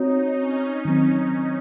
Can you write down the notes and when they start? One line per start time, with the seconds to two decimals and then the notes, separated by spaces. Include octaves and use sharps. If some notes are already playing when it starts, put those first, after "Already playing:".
Already playing: C4 D#4 F#4 C#5
0.37 C#4
0.85 D#3 F#3 C4